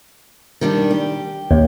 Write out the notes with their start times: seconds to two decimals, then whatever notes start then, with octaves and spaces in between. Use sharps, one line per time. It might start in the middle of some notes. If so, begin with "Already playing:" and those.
0.61 D#3 G3 D4
0.91 G4
1.51 D#2